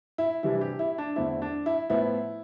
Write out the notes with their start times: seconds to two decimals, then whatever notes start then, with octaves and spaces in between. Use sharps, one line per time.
0.18 E4
0.43 C3 E3 G3 D4 E4
0.61 G4
0.79 E4
0.98 D4
1.16 E2 D3 A3 C4 E4
1.42 D4
1.66 E4
1.90 A2 F3 B3 E4